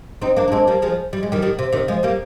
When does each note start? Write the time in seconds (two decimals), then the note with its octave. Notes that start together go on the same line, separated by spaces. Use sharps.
0.22 C4 D#4
0.37 A#3 D4
0.48 D4
0.52 G#3 C4
0.67 G3 A#3
0.82 F3 G#3
1.13 G3
1.23 G#3
1.32 D#3 G3
1.42 D#3 G3
1.59 C3
1.72 C3 D#3
1.88 F3 G#3
2.03 G3 A#3